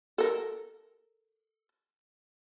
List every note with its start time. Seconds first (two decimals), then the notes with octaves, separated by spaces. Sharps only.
0.18 A4 A#4